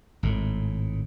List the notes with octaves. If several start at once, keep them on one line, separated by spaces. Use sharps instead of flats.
G#1 A2